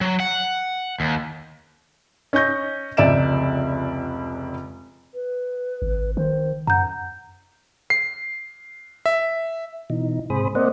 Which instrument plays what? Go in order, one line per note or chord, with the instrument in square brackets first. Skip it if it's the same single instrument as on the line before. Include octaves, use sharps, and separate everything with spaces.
[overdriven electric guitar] F#3
F#5
D#2
[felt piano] C#4 D#5 C#6 G6 A#6
F1 C#2 D5 E5 D7 E7
[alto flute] B4
[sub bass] G#1
[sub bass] D#3 [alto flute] C5
[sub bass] F#2 [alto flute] F#5 [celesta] A#5 G6
[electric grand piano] C7
E5
[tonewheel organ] B2 E3 D#4
G#2 C3 G#4 C5 B5 D#6
A#3 C4 C5 D5 D#5 F#5